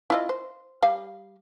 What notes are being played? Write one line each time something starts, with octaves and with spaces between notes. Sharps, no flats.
E4 F4 D#5
C5
G3 F5